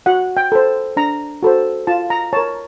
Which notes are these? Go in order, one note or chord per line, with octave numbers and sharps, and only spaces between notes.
F#4 F#5
G5
A4 C5
D4 A#5
F#4 A4 C5
F4 A5
A#5
A#4 C#5 A5